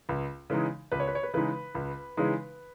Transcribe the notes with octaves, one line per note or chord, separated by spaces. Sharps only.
C#2
C#3 E3 G#3 D#4
C#2 B4
C#5
B4
C#5
B4
C#3 E3 G#3 D#4 B4
C#2
C#3 E3 G#3 D#4